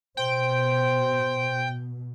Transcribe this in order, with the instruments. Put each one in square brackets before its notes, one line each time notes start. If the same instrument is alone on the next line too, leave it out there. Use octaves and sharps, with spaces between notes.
[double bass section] B2 [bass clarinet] C5 [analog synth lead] G5